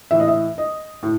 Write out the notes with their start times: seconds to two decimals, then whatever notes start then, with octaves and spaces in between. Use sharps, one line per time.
0.11 A2 E3 E5
0.20 D#5
0.28 E5
0.58 D#5
1.03 A2